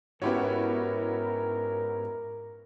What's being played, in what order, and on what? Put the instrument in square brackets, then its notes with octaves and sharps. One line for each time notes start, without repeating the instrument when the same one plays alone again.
[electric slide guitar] G#2 [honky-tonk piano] B3 E4 F#4 [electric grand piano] C#4 G4 C#5 [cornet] A#4